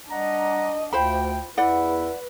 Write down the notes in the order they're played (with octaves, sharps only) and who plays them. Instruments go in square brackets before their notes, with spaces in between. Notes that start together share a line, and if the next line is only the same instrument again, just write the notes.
[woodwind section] G3 F#5 A#5 [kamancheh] D4 D#5
[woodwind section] D2 [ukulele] F4 C5 B5 [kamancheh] G5
[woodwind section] E2 E4 [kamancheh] B4 [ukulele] D5 F#5